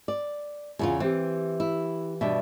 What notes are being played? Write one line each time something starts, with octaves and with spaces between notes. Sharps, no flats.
D5
E2 C#3 F4
E3 C4 G4
E4
G2 B2 D4 E5